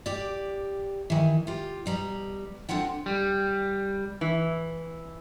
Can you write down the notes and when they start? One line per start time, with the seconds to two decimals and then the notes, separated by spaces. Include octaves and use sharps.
0.06 G4 D5
1.10 D#3 E3
1.47 F4 G4
1.86 B2 G3 A#5
2.69 D3 C4 F4 F#5 G5
3.06 G3
4.21 E3